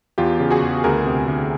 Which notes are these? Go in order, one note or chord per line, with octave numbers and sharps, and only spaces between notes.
E2 F4 G4
C#3
F#4 G#4
E2
D2 G#4 A#4
C3
D2